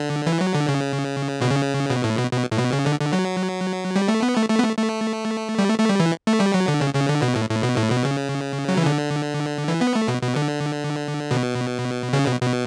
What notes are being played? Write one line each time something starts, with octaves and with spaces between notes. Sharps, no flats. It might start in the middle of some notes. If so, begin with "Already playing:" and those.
Already playing: D3
E3
F#3
D3
C#3
B2
C#3
B2
A2
B2
B2
A2
B2
C#3
D3
D3
F#3
G3
A3
B3
A3
A3
B3
A3
A3
G3
A3
A3
G3
E3
A3
G3
F#3
D3
C#3
C#3
D3
B2
A2
A2
B2
A2
B2
C#3
F#3
E3
D3
E3
B3
A3
B2
B2
D3
B2
C#3
B2
B2